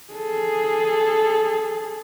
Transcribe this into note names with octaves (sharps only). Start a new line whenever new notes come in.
G#4 A4